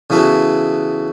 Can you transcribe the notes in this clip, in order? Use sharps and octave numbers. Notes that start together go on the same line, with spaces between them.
C#3 E3 B3 F#4 A4